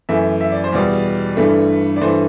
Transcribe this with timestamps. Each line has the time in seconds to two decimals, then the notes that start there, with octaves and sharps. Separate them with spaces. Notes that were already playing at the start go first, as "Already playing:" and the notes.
0.09 F#2 E3 A3 E5
0.41 E5
0.52 D5
0.64 C5
0.72 E2 B2 G3 D5
1.37 G2 E3 A3
1.96 D5
2.01 G2 E3 A3 C5